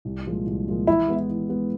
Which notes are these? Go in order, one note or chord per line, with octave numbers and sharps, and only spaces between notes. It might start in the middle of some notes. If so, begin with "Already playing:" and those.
C2
A#2 F3 G#3
C2
A#2 F3 G#3
E3 E4
G#3 B3
E3
G#3 B3